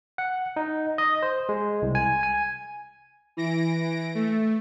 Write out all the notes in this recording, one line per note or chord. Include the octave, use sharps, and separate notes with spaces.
F#5
D#4
D#5
C5
G#3
C2
G#5
G#5
E3 A#6 D7
A3